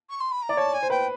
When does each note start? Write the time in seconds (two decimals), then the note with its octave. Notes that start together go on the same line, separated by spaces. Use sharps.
0.10 C#6
0.20 C6
0.31 B5
0.42 A#5
0.49 D5
0.57 C#5 A5
0.73 G#5
0.83 C5
0.90 B4 G5